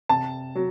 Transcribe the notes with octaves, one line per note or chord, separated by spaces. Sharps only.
C3 A5
F#3